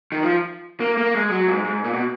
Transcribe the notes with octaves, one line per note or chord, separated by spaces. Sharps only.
D#3
F3
A#3
A#3
G#3
F#3
G#2
G#2
A#2
B2